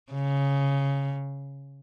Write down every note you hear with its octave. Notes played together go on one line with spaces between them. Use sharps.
C#3